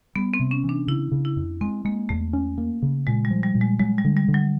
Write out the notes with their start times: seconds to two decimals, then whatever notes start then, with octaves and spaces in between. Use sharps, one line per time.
0.16 G3 B3
0.34 C4
0.40 C3
0.51 C#4
0.64 E3
0.69 D4
0.87 C#3 E4
1.12 C#3
1.25 E4
1.37 F2
1.61 G#3 C4
1.85 G#3 A#3
2.09 E2 A3
2.33 C#4
2.58 A#3
2.82 C#3
3.07 A#2 G#3
3.25 G3
3.30 F3
3.43 G3
3.55 A#2
3.61 G#3
3.79 F#3 G#3
3.98 G3
4.05 D3
4.17 G3
4.28 D3
4.34 F#3